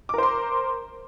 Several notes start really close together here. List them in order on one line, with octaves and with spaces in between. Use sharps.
D6 A#4 C5 C6